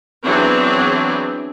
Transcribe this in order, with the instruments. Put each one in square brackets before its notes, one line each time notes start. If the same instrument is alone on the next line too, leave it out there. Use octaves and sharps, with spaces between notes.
[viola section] E3 F#3 B3 C4 D4 G#4